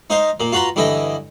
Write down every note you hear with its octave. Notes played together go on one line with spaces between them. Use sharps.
D#4 C5 D#5 F5
A#2 A#3
F4 F#4 B4 A#5 C6
G2 D3 E3 E4 D#5